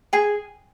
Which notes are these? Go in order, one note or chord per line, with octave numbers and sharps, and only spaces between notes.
G#4 G#5